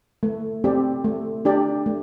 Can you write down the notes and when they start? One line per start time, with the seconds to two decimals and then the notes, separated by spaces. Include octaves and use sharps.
0.23 A3
0.64 C4 G4 D5
1.04 A3
1.45 D4 G4 D5
1.86 A3